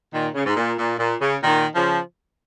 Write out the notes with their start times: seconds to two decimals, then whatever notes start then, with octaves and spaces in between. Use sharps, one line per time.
0.13 A#2 D#3
0.34 C#3
0.46 G#2
0.57 A#2
0.78 A#2
0.99 A#2
1.21 C#3
1.43 A#2 D#3
1.75 C#3 F3